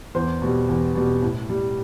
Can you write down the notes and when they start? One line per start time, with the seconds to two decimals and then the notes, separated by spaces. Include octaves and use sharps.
0.15 E2 C5
0.42 B2 G3
0.69 E2
0.95 B2 G3
1.22 A2
1.49 G3